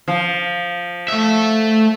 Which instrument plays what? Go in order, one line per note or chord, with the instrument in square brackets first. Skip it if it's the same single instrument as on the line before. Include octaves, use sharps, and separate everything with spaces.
[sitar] F3
[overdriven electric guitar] A3 E5